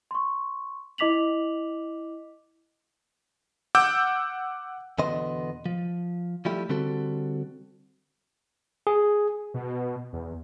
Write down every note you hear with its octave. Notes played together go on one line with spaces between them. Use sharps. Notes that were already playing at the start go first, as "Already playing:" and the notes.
C6 C#6
E4 D#5 D6 B6 F7 F#7
F#5 D6 E6 G6
E2 B2 D3 B3 D#5 C6
F3
F3 G3 A3 E4 G4
D3 G3 C4 F#4 A4
G#4
B2
E2